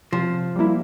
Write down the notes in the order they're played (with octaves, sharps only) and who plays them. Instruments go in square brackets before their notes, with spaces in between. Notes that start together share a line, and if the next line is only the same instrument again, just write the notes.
[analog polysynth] C3 [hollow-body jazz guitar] F3
[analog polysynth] G3 A#3 E4